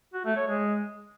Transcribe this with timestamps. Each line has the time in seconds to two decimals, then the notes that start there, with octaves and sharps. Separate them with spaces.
0.14 F#4
0.25 A3
0.36 C#5
0.47 G#3